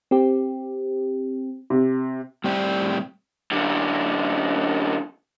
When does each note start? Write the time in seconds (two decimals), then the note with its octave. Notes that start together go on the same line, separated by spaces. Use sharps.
0.11 C4 G4
1.70 C3
2.44 A2 G3 C4 G4 D5 G5
3.52 F#2 D3